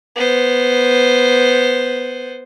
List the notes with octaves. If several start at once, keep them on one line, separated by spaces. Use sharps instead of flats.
B3 C5